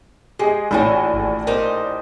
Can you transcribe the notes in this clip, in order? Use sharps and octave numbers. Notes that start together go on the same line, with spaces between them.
G#3 G4 G#4 D#5
A#1 A2 E3 F#4 C#5 G5 G#5 B5
G#1
D#4 G4 A#4 C5